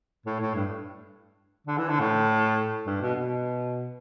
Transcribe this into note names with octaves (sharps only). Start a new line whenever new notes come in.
A2
A2
G2
D3
E3
D3
A2
G2
B2
B2